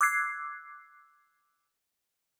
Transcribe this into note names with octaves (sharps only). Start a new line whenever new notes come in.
D6 E6 F#6 G#6 C7